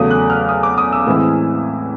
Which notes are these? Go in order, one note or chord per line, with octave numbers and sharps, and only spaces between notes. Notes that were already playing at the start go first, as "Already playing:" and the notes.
Already playing: E2 C#3 F#3 A3 D#6
F#6
F6
D#6
D6
D#6
E6
A2 E3 G#3 C4 E4